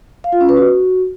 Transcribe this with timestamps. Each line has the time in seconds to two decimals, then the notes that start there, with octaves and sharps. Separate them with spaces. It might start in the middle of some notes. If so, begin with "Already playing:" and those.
0.24 F5
0.32 F4
0.41 C#4
0.49 B4
0.57 F#4